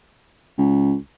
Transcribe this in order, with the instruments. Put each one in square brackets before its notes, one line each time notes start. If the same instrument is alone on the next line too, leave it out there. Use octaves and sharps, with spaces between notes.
[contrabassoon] C#2